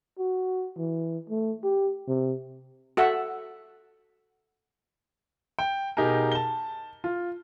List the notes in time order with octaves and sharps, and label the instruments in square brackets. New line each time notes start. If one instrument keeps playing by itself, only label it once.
[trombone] F#4
E3
A3
G4
C3
[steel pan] F#4 A4 E5 F#5
[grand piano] G5
B2 D#4 G4 G#4 A#4
A5 G7
F4